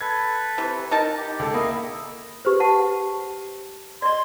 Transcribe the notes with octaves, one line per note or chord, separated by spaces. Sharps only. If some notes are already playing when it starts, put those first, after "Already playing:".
A4 B4 G#6
C3 E3
D#4 A#4 A5
G4
C#2 A4
A#3 E4 D#5
G4 B4 C5
F#5 A5
D5 D#5 C6